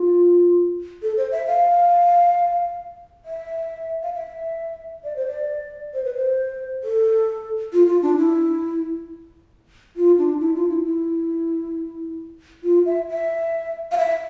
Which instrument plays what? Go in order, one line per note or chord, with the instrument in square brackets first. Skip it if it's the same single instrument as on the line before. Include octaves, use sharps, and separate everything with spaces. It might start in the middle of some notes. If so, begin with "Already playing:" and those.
Already playing: [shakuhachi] F4
A4
C5
E5
F5
E5
F5
E5
D5
C5
D5
C5
B4
C5
A4
F4
F4
D4
E4
F4
D4
E4
F4
E4
E4
F4
E5
E5
F5
E5